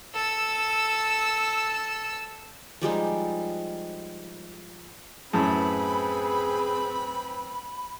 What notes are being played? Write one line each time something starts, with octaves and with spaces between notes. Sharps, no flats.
A4 E6
F3 G3 G#3 D#4
F#2 A2 C4 G#4 B4 A5 B5